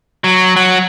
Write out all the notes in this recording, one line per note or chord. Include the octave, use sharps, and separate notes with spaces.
F#3
F#3